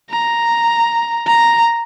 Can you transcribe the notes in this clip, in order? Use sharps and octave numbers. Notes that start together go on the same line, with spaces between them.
A#5
A#5